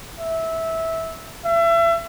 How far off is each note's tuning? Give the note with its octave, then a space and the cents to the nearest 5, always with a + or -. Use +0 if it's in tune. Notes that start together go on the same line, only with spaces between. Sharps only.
E5 -15
E5 +30